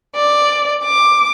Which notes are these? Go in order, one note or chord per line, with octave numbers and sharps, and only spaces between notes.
D5
D6